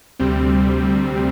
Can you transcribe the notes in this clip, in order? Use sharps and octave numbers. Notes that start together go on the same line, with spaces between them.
D2 C3 G3 C4